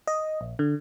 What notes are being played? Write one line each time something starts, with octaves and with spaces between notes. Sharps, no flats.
D#5
A#1
D3